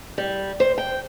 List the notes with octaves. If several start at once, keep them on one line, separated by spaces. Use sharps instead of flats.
G3
C5
G5